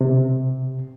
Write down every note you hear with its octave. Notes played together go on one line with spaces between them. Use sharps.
C3